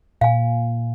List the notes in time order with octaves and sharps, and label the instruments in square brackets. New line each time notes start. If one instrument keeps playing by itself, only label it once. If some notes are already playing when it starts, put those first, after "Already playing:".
[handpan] A#2 [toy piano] F5 G#5